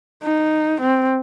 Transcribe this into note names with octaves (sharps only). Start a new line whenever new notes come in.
D#4
C4